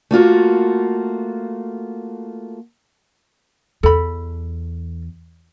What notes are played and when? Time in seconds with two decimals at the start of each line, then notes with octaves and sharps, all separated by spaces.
0.11 A3 A#3 F4 F#4
3.83 E2 A4 B5